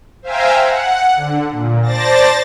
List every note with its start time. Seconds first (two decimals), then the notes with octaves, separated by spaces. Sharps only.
0.22 C5 E5 F5 G5 G#5 A#5
0.59 F#5
1.16 D3
1.51 A#2
1.82 C5 D5 A5 A6 A#6